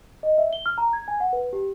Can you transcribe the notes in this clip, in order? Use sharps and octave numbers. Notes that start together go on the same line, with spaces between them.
D#5
E5
G7
F6
A#5
G#6
G#5
F#5
B4
G4